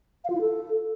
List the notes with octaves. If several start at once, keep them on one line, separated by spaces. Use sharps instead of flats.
F5
F4
E4
A4